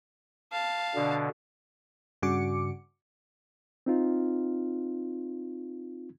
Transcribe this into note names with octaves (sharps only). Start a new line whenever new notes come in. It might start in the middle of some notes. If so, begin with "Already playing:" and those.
F5 A5
B2 D3 D4
G2 C#3 F#4 D6 C#7
C4 D#4 F4